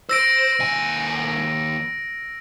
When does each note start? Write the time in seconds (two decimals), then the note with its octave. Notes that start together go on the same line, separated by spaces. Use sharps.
0.09 C5 E6 A#6 D7
0.60 D#2 G#5